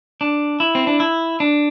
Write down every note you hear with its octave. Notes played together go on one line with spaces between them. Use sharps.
D4
E4
C4
D4
E4
D4